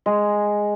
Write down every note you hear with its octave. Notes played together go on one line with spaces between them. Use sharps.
G#3